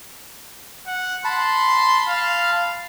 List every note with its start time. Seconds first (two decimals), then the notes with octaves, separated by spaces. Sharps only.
0.87 F#5
1.25 A5 B5 C6
2.08 F5